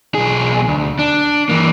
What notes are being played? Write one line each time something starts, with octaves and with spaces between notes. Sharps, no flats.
B1 G#4
D2
D4
E3 A#3